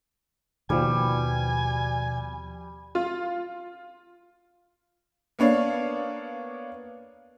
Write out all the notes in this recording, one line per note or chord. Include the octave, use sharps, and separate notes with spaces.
D#2 B2 F3 G3 G#5
F4
A#3 B3 D4 C#5 D5 F5